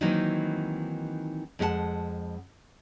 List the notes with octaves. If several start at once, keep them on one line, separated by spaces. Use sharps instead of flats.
D#3 E3 F#3 A#3 C4 D#4
F2 G#3 D#4 E4 F#5 A5